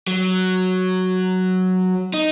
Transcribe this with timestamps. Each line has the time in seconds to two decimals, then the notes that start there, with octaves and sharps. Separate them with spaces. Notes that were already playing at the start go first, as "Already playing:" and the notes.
0.07 F#3
2.14 D#4